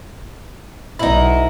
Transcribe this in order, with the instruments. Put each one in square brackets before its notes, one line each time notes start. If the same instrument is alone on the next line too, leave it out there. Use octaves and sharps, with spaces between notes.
[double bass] B1 [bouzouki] D#4 E4